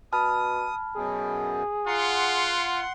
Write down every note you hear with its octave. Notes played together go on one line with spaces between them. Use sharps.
B2 A5 B5 D#6 F6
F#2 B2 G#4
F4 F#5 A#5 C6